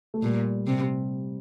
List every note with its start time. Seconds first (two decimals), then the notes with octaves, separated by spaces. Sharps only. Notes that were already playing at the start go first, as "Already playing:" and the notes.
0.14 A3
0.22 A#2 G3
0.67 C3